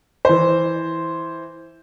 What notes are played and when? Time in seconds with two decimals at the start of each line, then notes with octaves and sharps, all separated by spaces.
0.25 E3 C5